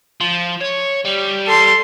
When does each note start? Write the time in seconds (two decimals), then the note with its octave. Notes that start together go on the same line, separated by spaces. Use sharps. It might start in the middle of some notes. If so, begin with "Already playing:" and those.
0.21 F3
0.61 C#5
1.05 G3
1.47 A4 C6